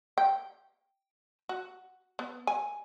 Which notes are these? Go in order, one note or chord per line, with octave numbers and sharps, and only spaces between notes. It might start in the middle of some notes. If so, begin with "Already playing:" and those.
G5
F#4
B3
G#5